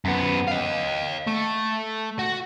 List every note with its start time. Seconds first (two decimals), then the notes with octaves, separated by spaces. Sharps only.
0.05 F#2 B3
0.48 D#5 F5
1.28 A3
2.19 F#4